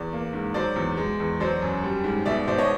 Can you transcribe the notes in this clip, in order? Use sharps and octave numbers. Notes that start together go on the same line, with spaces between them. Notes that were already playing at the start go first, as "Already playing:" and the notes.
Already playing: E2 D5
A#3
G#2
F#3 C5 D5
E2
G#3
E2
F#3 C5 D5
F#2
G3
G#2
B2 D5 E5
B2 C5 D5
C#5 D#5